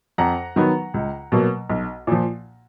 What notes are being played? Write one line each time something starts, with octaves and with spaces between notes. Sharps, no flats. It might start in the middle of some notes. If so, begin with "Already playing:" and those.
F2 F#5 A#5
D#3 F#3 B3
C#2
B2 F#3 A#3
B1
A#2 F3